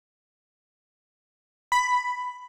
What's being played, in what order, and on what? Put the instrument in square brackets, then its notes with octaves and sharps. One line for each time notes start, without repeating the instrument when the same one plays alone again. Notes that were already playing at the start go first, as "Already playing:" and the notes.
[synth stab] B5